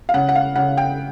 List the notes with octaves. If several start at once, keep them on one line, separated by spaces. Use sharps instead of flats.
F5
C#3 F#5
F#5
F5
C#3 F#5
G5